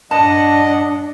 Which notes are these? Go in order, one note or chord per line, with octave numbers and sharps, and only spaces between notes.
G2 D4 D#5 F#5 A5